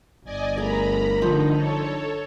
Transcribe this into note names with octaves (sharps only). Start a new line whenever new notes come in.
G1 D5 D#5 G#5
A3 G#4 A#4 A#5 B5
D3 F3 D#4
A4 C#5